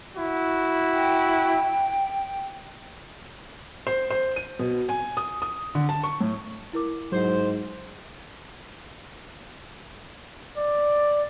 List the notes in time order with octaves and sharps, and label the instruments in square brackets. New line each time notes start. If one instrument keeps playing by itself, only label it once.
[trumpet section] E4 F#4
[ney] G5
[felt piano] C5
C5
D#7
B2
G#5
D#6
D#6
D3
A5
C#6
A2
[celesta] E4 A#4 D6
[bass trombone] G#2 [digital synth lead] F#3 [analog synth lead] C5
[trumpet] D5